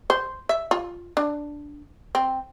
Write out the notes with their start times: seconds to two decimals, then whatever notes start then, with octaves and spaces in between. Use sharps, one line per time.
0.10 C5
0.49 E5
0.71 F4
1.17 D4
2.15 C4